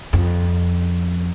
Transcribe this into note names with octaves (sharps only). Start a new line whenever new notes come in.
F2